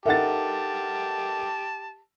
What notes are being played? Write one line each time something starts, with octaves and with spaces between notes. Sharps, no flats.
D#4 G4 A4 A#4 E5 F#5 A5 A6